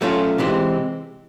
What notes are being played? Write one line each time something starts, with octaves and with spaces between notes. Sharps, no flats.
F#3 A3 C#4 F4
C3 E3 G#3 C4